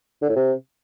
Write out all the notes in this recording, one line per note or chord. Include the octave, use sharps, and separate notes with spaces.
D3
A2
C3